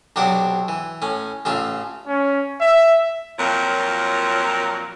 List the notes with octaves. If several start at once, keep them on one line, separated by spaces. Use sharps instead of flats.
B1 C3 F#3 D4 F#5 D6
E3
A2 C#4
A1 C#3 F4 E5
C#4
E5
F2 A#2 F#3 A#4 C#5